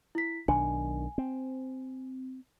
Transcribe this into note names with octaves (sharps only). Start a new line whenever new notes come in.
E4 B6
B1 D#3 D4 G#5
C4